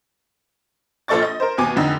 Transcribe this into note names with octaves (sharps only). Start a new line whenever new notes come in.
A#1 F4 A4 D5 C#6 A6
D#5
A#4 C5
D#2 B2 G#5 D6
F1 D3 D#4